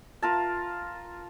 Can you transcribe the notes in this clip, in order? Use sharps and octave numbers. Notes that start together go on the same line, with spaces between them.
F4 A#4 A5